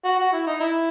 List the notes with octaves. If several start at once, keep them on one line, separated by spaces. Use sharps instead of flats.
F#4
F#4
E4
D#4
E4